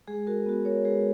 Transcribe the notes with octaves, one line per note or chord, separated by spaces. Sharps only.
G#3 G#4
F#4 A#4
B3 F#4
A#4 C#5
G#3 G#4 B4